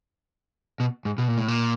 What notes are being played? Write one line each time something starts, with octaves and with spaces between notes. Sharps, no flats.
B2
G#2
B2
A#2
A2
A#2